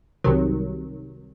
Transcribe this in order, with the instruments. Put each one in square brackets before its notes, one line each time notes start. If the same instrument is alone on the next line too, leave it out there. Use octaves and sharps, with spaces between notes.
[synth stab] C2 C3 D#3 F#3